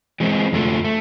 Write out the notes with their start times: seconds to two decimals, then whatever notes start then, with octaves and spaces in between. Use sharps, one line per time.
0.20 E3 G#3 C4
0.52 F2 D3 F3 A3
0.84 A3